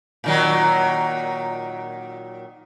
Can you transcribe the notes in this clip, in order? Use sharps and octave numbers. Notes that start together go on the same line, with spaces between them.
A#2 D#3 F#3